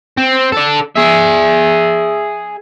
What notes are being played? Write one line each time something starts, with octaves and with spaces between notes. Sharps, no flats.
C4
D4 A4
G#4 E5